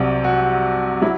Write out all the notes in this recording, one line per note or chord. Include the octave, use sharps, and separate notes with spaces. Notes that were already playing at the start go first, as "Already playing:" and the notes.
Already playing: C2 C3 F#3
F#4
F#3 E4